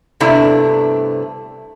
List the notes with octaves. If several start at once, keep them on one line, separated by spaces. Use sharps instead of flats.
G2 C3 A3 B3 D4 E4